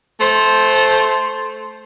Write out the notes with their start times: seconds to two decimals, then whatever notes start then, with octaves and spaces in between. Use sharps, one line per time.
0.19 A3 C5